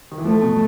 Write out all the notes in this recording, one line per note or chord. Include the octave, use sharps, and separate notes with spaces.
D#3
E3
F3 A3
B2